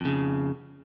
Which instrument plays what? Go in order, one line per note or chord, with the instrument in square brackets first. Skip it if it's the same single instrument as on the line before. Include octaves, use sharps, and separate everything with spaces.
[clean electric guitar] F2 C#3